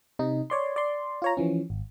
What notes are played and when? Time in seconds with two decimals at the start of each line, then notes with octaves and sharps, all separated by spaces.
0.19 C3 D#4
0.50 C#5 D5 C6
0.76 D5 C6
1.22 F4 C#5 A#5
1.37 E3 F3 C#4
1.70 G#1